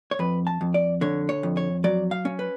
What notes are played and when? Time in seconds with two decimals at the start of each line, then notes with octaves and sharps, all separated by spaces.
0.11 C#5
0.19 F2 B4
0.47 A5
0.61 F2
0.74 D5
1.01 D3 C#5
1.29 C#5
1.43 F2
1.57 C#5
1.84 F#3 D5
2.11 F5
2.25 C#4
2.39 B4